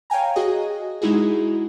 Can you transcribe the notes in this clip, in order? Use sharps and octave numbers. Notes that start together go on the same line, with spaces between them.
C#5 F5 G5 G#5 A#5
F#4 G#4 D#5
G#3 D#4 E4 F#4 G#4